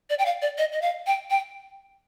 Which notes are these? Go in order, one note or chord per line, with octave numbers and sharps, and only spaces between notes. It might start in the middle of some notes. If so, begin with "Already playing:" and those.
D5
G5
F5
D5
D#5
D#5
F5
G5
G5